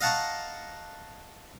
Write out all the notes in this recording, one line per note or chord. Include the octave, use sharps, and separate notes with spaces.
D#5 F5 F#5 A5 A#5 C#6